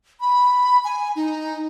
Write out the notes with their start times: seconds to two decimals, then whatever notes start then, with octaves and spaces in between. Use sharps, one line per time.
0.20 B5
0.84 G#5
1.16 D#4